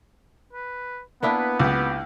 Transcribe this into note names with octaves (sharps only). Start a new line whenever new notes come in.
B4
A#3 B3 D4 E4 B4
C#2 G4